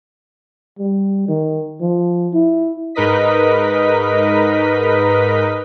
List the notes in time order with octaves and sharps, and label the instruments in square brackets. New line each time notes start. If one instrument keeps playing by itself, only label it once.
[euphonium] G3
D#3
F3
E4
[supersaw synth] G#2 D#4 A#4 B4 D#5 B6